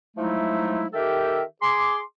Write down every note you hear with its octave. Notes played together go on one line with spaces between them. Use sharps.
F3 F#3 G#3 A3 D#4 E4
D#3 G4 A4 A#4 E5 G5
G#4 C6 D6